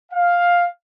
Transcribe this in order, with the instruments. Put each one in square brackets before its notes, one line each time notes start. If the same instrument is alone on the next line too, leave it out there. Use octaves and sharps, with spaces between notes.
[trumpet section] F5